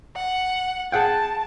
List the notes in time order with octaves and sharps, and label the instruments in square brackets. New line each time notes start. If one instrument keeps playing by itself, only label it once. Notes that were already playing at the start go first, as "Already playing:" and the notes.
[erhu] F#5
[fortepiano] G#4 F#5 G5 [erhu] A5